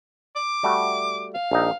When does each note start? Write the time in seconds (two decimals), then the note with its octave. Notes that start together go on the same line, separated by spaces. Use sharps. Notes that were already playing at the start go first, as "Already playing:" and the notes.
0.36 D6
0.63 G3 A3 F#4
1.34 F5
1.51 A#1 D#4